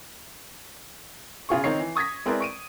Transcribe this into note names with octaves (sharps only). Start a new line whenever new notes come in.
C#3 F4 G#4 C#6
D#3 C4 D#4 C#5 C7
E3
C#6 D#6 G#6 A#6 B6
G#3 C4 E4 A#4 B4 D5
C#6 D7 D#7